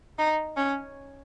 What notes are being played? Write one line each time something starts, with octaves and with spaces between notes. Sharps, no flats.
D#4
C#4